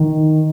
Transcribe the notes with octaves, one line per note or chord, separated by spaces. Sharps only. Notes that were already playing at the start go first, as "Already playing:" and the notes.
Already playing: D#3